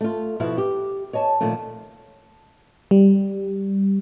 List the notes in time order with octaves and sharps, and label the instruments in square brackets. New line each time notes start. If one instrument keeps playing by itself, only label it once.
[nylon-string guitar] A3 F4
B2 F3 E4 F#4 E5 F5
G4
C#5 D#5 G#5 A5
A#2 D#3 F3 A3
[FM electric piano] G3